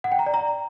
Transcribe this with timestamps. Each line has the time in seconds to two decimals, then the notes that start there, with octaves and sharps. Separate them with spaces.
0.04 F#5
0.12 G5
0.19 A#5
0.26 D5
0.34 A#5